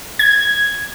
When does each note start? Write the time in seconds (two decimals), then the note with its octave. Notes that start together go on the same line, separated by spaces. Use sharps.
0.19 G#6